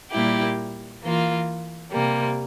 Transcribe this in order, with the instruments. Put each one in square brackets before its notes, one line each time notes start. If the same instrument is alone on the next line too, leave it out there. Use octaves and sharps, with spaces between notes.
[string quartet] A#2 G3 A#3 E4 G4
E3 A#3 F4
C3 G3 A#3